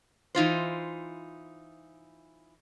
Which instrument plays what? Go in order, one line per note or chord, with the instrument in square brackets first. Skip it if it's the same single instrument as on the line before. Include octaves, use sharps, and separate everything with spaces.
[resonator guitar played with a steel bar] E3 D#4 F4 C5